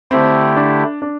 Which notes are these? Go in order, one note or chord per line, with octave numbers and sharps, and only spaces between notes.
D3 A3 C4 E4 G4
D4
D4